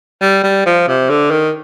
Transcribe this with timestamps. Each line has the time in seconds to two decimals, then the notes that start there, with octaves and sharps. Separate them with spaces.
0.22 G3
0.44 G3
0.66 F3
0.88 C3
1.10 D3
1.31 D#3